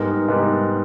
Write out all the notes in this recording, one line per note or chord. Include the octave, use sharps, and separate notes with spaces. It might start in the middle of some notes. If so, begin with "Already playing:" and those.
Already playing: G#2 G3 B3 D#4 A#4
G#2 G3 B3 D#4 A#4